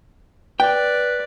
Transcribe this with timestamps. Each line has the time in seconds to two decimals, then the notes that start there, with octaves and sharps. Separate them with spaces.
0.60 B4 D5 G5